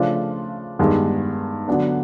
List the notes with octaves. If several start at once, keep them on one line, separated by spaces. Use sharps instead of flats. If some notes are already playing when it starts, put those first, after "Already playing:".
Already playing: C#3 F3 A3 D4 F4
G2 D#3 G#3 B3
D3 F#3 B3 D4